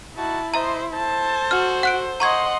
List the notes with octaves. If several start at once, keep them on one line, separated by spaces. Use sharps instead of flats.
A#3 D#4 E4 F#4 A5
C5 D#5 E5 A5 A#5 D#6
A4 C5 A5
F#4 F6
F#5 F#6 D7
D#5 F#5 A#5 C6 C#6 G#6